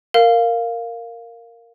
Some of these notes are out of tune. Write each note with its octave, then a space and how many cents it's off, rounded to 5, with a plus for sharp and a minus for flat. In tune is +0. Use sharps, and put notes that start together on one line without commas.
A#4 -10 F5 +0